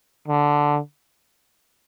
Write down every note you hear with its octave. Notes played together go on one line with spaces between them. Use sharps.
D3